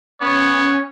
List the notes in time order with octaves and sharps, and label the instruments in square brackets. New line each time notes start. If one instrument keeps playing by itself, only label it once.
[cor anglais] B3 [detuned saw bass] C#4 [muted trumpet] C#5